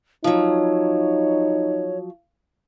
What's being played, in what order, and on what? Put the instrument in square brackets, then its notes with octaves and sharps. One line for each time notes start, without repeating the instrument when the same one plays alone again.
[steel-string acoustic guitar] F3 F#3 [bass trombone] D#4 [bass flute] C#5